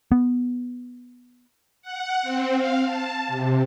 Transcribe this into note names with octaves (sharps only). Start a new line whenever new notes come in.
B3
F#5
C4
F5
A5
C3